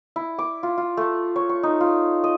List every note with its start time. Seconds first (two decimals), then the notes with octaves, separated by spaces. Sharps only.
0.16 E4
0.39 D6
0.63 F4
0.78 F4
0.97 A3
1.36 C#5
1.49 C#6
1.63 D#4
1.81 F4
2.24 D#5